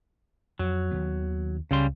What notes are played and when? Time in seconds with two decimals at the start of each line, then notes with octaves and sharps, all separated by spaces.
0.59 F2 F#3
0.91 D#2 D#3 B3
1.71 C#2 C#3 G3 C6